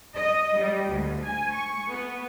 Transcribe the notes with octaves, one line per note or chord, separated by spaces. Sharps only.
D#5
G3
D2
G#5
C#6
B3